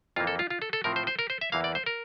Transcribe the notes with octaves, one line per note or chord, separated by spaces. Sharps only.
F2 E3 A#3 F4
A4
F4
F4
A4
A4
A2 F3 C4 A#4
C5
C5
A#4
C5
E5
E2 E3 A#3 F5
D5
C5
A#4